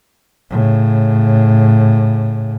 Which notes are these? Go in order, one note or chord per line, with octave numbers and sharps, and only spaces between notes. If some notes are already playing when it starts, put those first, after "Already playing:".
A2 C#3